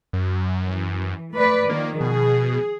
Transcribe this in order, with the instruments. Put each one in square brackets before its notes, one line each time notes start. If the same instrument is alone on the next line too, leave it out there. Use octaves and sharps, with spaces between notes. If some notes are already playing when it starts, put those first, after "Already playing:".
[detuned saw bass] F#2
[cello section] E3
A3 B4 D5
[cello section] D#3 F3 [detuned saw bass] A#3
[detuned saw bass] B2 [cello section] G#4